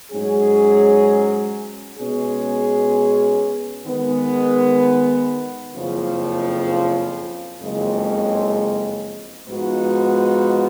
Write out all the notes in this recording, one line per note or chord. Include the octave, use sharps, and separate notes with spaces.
G#2 F#3 C#4 G#4
B2 G#3 C#4 G#4
D#3 G#3 B3
F#1 F2 C#3 F3
F#1 F2 C#3 G#3
G#2 F3 B3 D#4 F#4